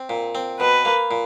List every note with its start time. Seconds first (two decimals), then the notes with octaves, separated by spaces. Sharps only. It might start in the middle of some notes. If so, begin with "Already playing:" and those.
Already playing: C4
0.10 A#2
0.35 C4
0.60 B2 B4
0.85 A#3
1.11 A#2